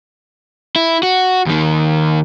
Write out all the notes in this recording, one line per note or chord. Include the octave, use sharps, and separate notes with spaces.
E4
F#4
D#2 D#3